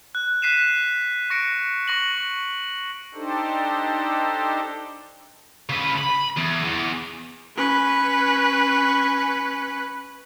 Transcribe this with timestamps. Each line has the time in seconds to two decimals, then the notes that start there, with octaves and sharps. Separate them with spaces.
0.15 F#6
0.42 F#6 B6 C7 D#7 E7
1.30 C#6 A#6 C#7 D7
1.88 C#6 A#6 F#7
3.14 D4 D#4 G4 A4 C5
5.69 C#3 B4
5.98 B5
6.37 E2
6.64 E2
7.57 C#4 B4